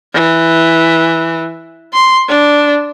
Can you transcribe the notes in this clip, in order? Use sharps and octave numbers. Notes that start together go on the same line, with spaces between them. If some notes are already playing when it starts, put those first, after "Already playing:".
E3
C6
D4